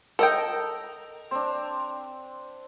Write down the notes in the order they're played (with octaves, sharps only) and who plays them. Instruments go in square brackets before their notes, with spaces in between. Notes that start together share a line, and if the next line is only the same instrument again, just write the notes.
[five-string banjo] A4 D#5 G5 [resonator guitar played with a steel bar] A#4
[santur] C4 D4